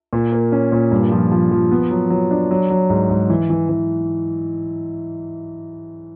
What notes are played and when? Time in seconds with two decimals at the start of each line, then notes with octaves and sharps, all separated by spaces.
0.13 A#2
0.32 A#3
0.52 C#4
0.72 A#2
0.91 G2
1.12 F3
1.32 F3
1.52 F3
1.71 B3
1.90 F#3
2.10 F#3
2.31 D4
2.51 F#3
2.70 F#3
2.90 G#2
3.10 G#2
3.30 E3
3.50 E3
3.69 E3